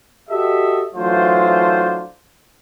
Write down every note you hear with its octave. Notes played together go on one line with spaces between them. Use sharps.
F#4 G4 A4 D#5 E5
E3 F#3 A3 D4 F4 C5